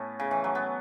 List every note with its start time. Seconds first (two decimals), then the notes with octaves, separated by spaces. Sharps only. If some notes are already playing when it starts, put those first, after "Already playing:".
Already playing: A2 B3 C#4
0.19 C#3
0.31 E3
0.44 F#3
0.55 B3